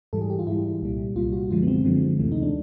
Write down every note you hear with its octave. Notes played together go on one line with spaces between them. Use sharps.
G#2 E3 G3 A4
G#4
G4
F4
G#2 E3 G3 E4
C2 A#2 G3
C2 A#2 G3 F4
F#4
F#2 D3 F3 G#3 F4
B3
C4
F#2 D3 F3 G#3
D2 C3 E3 A3
D#4
D4